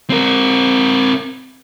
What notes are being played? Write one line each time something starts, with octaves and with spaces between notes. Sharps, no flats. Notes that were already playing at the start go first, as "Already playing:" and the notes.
C4 A#4